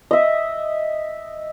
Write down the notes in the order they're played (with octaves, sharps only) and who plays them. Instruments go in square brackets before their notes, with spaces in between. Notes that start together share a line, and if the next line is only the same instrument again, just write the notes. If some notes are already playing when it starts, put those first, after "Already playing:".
[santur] D#5 E5